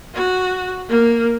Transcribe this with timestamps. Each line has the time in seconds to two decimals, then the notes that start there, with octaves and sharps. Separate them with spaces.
0.14 F#4
0.89 A#3